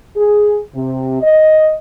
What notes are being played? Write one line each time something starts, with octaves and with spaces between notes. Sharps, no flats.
G#4
C3
D#5